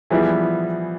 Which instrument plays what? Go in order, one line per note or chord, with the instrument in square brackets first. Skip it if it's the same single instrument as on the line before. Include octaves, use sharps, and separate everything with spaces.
[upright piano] E3 G3 B3 E4 G#4 [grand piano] F3